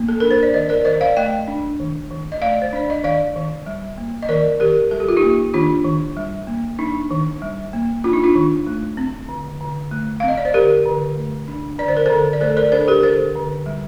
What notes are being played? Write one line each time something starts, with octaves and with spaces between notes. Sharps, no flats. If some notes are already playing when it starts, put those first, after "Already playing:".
Already playing: A#3
A4
D4 A#4
C5
D5
D#3 C5 D#5
A#4 D5
D#3 C5 D#5
D5 F5
A3 D#5 G5
D4
D#3
D#3
D#5
A3 D5 F5
C5
D4 D5
D#5
D#3 D5 F5
D#3
G3
A#3
D#5
D#3 A#4 D5
D#3 G4 A#4
G3 A4
G4
F4
D#4 G4
A#3
D#3 D4 F4
D#3
G3
A#3
D4 D#4
D#3
G3
A#3
D4 F4
D#4
D4 F4
D#3
A3
C4
D3
D3
A3
C4 F5
D#5
D5
C5
D3 G4 A#4
D3
A3
D4
D3 D5
C5
A#4
D3 A4 C5
D5
A3 A4 C5
A#4 D5
D4 A4 C5
G4 A#4
D3 A4 C5
D3
G3